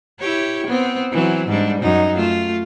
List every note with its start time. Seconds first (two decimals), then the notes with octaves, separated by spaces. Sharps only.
0.19 E4 G4 C#5
0.66 B3 C4
1.12 E3 F#3 C4
1.47 G#2 G3 D4
1.81 F#2 D#4
2.16 A3 F4